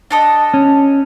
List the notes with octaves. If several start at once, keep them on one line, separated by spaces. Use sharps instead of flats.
D4 A4 D#5
C#4